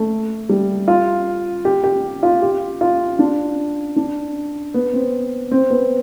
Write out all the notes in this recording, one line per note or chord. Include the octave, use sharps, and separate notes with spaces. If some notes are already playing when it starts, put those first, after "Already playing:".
Already playing: A3
G3
F4
G4
G4
F4
G4
F4
D4
D4
B3
C4
C4
B3